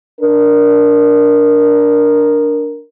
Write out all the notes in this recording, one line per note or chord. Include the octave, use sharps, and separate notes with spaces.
D4 A#4